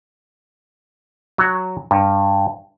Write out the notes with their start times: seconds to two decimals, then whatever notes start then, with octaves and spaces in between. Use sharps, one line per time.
1.38 F#3 F#4
1.91 G2